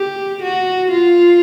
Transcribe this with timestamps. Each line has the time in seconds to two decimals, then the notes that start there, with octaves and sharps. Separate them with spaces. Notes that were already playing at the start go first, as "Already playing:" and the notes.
Already playing: G4
0.42 F#4
0.91 F4